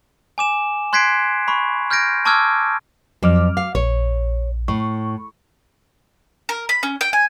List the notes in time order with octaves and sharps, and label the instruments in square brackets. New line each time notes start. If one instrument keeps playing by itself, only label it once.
[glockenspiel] G#5 D6 E7
C6 F#6 G#6 B6 C7 D7
B5 C#6
F6 G6 G#6 A#6 D7
A5 C#6 D6 E6 F6 G#6
[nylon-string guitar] F2 [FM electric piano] F#3 D6 F6
[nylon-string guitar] F5
[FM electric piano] A#1 [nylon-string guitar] C#5
[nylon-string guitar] A2 [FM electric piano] C#6
[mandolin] A#4
B5
C#4
G5
G#5